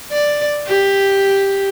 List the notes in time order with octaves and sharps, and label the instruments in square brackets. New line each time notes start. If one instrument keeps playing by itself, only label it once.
[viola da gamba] D5
G4